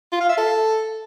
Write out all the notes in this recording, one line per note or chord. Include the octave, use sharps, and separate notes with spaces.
F4
F5
E5
A4